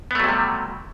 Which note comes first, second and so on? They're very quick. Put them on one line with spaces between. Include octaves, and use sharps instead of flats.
B3 A3 F#3 C3 G3